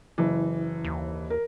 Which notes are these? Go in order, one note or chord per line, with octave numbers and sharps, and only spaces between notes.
F#1 E3
D#2
A#4